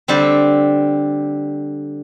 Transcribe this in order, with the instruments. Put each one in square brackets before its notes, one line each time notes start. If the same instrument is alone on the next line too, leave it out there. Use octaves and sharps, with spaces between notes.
[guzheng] D3 G3 C4 G4